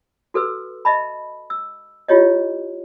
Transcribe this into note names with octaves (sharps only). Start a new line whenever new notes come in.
F#4 A4 B4 E6
D#5 E5 A5 B5
E6
E4 F4 G4 C#5 D#5